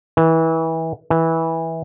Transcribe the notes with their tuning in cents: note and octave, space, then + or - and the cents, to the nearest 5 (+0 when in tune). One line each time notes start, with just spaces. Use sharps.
E3 -25
E3 -15